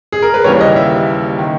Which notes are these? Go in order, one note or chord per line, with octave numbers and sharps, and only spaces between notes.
G#4
A#4
B4
D#2 C#3 E3 G3 C#5
D#5
E5
D#3